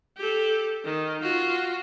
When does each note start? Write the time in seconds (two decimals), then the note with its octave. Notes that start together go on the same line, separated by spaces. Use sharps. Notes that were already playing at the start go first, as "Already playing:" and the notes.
0.18 G4 A4
0.84 D#3
1.22 F4 F#4